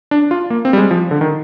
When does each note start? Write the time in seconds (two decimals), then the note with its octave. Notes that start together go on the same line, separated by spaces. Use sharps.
0.11 D4
0.31 F4
0.50 A#3
0.65 C4
0.73 G3
0.78 G#3
0.91 F3
1.11 D3
1.21 D#3